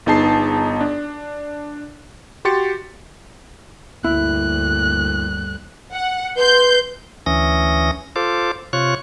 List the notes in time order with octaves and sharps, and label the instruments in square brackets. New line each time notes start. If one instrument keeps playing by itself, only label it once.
[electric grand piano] G1 B3 D#4 G#4 A5 C7
D4
F#4 G4 C6 A6 C#7
[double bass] D2 G2 [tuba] A#3 [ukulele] E4 [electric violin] F#6
[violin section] F#5
[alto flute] B4 [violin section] C6 G6
[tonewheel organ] D2 E3 C#4 D#6 A#6
F4 A4 C5 D6
C3 F4 C#5 C#6 F#6